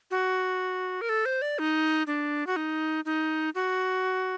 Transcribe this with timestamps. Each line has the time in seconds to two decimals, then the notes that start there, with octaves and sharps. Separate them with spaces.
0.11 F#4
1.01 A#4
1.09 A4
1.25 C5
1.42 D5
1.59 D#4
2.07 D4
2.47 F#4
2.56 D#4
3.05 D#4
3.55 F#4